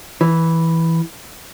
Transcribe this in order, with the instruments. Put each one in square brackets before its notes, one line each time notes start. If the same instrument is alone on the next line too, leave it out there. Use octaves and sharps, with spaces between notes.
[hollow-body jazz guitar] E3